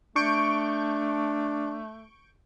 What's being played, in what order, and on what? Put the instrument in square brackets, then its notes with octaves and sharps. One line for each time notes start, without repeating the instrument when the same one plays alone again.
[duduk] A3 [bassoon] D4 [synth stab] C#6 G6 D7